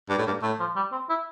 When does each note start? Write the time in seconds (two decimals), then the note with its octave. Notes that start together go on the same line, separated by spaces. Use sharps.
0.09 G2 D4
0.19 A2
0.26 G2 A#3
0.42 A2 A3
0.60 F3
0.76 G3
0.92 C4
1.09 E4